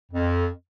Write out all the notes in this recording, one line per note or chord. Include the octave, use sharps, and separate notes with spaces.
F2